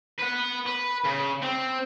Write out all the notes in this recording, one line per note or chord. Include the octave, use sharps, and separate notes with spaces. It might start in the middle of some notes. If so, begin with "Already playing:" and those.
B4 F#5
B4
C#3
C4